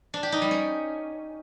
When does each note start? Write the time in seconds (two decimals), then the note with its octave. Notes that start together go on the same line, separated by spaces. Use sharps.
0.14 D4
0.23 G4
0.32 D#4
0.42 G3
0.51 C#4